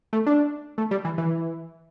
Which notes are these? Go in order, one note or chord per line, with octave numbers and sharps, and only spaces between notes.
A3
D4
A3
G3
E3
E3